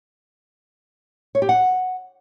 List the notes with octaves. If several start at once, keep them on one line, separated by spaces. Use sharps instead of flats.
C#5
G4
F#5